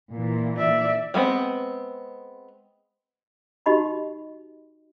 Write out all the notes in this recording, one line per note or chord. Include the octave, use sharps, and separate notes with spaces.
A#2 E3
D5 E5
G3 G#3 B3 C4
D#4 F#4 G4 D#5 B5 C#6